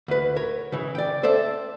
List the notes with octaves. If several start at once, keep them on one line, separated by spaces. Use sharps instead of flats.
D2 B4
A#4 C#5
C#3 E3
D5 G5
A4 C5 D5 E5